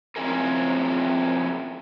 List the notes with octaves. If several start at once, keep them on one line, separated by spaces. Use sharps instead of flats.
F3 C4 C#4 E4 G#4 A#4